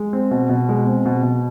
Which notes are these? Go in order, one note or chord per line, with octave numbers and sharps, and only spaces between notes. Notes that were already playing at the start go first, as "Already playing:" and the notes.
Already playing: G#3
C4
B2
B2
G#3
C4
B2
B2